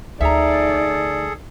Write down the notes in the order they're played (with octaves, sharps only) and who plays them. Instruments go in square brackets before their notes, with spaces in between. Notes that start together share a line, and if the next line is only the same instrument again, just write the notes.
[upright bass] D2 [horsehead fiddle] D#4 D5 [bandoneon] G#4 A4 [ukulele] E5 A#5